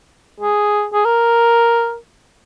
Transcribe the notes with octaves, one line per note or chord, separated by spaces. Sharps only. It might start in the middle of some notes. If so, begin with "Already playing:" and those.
G#4
G#4
A#4